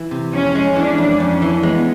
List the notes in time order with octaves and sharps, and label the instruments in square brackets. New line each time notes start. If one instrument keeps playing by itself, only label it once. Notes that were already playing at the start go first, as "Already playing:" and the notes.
Already playing: [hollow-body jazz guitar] E3
C3
[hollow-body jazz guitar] F2 [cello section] C#4
[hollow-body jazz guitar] G#3
[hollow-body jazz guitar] E3 [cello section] D4
[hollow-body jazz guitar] F2
[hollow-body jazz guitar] F2 [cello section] C#4
[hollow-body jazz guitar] E3
[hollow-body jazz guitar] G#3 [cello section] B3